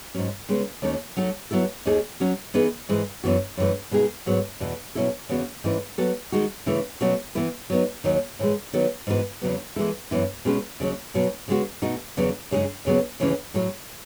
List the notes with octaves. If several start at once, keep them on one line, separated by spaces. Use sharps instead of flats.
G#2 F#3 C#4
C#3 G#3 B3
D#2 D#3 A3 C#4
F#3 A3 D#4 F#4 A4
F#3 B3 E4 A4
D#2 D#3 A3 D#4 G#4
F#3 C#4 F#4
E3 B3 D#4 G#4 B4
G#2 E3 G#3
F#2 E3 B3 F#4
F#2 E3 A3
B2 G#3 D#4 G#4
G#2 F#3 B3
E2 B2 A3
B2 F#3 C#4 E4 A4
E2 C#3 E3 B3 F#4
G#2 E3 A3 C#4 E4
F#3 B3 F#4 A4
D#3 G#3 D#4 F#4
C#3 E3 A3 E4
B2 F#3 A3 C#4 F#4
E3 B3 E4 B4
F#3 B3 D#4
D#2 D#3 F#3
A2 E3 G#3
D#3 F#3 B3 F#4 A4
G#2 E3 B3 F#4 B4
E2 C#3 F#3 B3
E3 G#3 B3 E4 A4
F#2 E3 B3 E4
B2 G#3 C#4 G#4 B4
D#2 C#3 F#3 C#4
B2 F#3 C#4
C#3 G#3 B3 F#4
B2 A3 D#4 F#4
E2 C#3 F#3 B3 F#4
F#2 C#3 G#3 D#4 G#4
D#2 C#3 F#3 B3
D#2 C#3 E3 A3 C#4
A2 F#3 A3